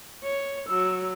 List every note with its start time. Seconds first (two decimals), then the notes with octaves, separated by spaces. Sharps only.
0.23 C#5
0.69 F#3 E6